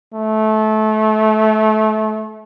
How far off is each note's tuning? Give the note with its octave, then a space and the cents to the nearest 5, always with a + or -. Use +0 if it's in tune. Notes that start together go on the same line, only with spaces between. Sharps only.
A3 -25